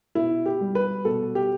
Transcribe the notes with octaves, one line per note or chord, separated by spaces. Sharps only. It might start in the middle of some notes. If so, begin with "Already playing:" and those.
B2 E4
G4
G3
B4
B2 A4
G4